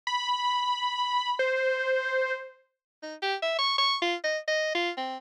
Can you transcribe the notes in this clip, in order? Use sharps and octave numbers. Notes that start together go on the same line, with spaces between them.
B5
C5
D#4
G4
E5
C#6
C#6
F4
D#5
D#5
F4
C4